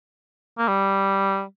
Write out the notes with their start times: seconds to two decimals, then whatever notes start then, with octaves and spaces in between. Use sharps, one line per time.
0.58 A#3
0.68 G3